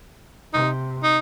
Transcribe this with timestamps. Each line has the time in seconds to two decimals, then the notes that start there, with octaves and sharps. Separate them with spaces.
0.54 C3 D#4
1.03 D#4